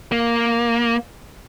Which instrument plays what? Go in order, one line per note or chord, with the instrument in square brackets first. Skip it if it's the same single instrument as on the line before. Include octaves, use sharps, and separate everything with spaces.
[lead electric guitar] A#3